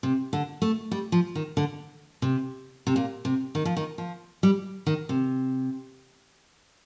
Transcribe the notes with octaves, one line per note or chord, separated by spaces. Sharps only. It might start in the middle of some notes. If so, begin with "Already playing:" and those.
C3
D3
A3
G3
F3
D#3
D3
C3
C3
A#2
C3
D#3
F3
D#3
F3
G3
D#3
C3